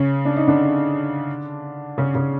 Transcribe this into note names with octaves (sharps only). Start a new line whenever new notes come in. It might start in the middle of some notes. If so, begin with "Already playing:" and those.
Already playing: C#3 C#4
D4
D#4
D3 D4
C#3 C#4
C#3 C#4